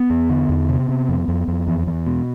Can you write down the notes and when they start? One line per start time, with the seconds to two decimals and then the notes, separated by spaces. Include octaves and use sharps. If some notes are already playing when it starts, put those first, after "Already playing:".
Already playing: B3
0.10 E2
0.30 D3
0.49 E2
0.69 C3
0.89 C3
1.09 F2
1.28 F2
1.48 F2
1.67 E2
1.87 E2
2.06 B2